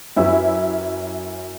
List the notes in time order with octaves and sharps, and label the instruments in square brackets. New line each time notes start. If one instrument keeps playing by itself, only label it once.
[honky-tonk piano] F#2 C#4 E4 G4 B4 E6